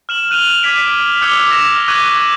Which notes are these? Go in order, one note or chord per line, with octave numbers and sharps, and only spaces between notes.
F6 E7 F#7
F6 F#6 D#7 F7 G7
D6 G#6 B6 D7 D#7
D6 E6 F#6 G#6 C#7 G7
F6 A#6 E7
C#6 D6 F#6 G#6 D#7 F#7